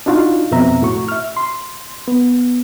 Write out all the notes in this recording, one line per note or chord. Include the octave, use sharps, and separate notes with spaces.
D4 D#4 F4 F#4 F5
F2 B2 C4 E5 A#5
A2 F#4 C#6
E5 F6
C6
B3